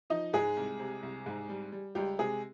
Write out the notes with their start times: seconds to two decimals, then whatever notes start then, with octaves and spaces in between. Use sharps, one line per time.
0.10 F3 D#4 D#5
0.33 G#2 G#3 G#4
0.57 C2
0.80 C3
1.03 C2
1.26 G#2
1.49 G3
1.72 G3
1.95 C#2 G3 G4
2.19 C3 G#3 G#4